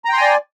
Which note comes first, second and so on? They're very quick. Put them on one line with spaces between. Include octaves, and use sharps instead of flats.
A#5 G5 C6 G#5 D5